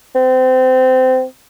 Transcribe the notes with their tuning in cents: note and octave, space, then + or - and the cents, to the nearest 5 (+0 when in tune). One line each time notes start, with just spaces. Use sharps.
C4 -25